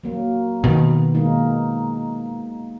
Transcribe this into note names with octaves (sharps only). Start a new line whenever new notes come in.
F#3 A#3
B2 D#3 B3
G#3 A#3 D#4